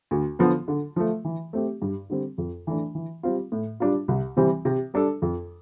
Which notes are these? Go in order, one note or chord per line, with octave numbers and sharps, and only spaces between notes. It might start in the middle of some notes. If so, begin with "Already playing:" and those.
D2
D3 F3 B3
D3
F3 A3
E3
A3 C4 G4
G2
D3 G3 C4
F2
E3 A3 D4
E3
G3 C4 F4
A2
G3 D4 F4
C2
C3 E3 G3 C4
C3
G3 D4 A4
F2